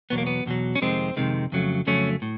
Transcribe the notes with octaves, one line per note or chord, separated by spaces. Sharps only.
E2 B2 F#3 B3
A#3
B3
E2 B2 F#3
C#4
F2 C3 D#3 G#3 C4
F2 C3 D#3 G#3
F2 C#3 F#3 A3
F2 C#3 F#3 A3 C#4
A2